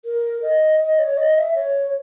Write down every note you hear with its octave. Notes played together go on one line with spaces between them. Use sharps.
A#4
D#5
D#5
C#5
D#5
E5
C#5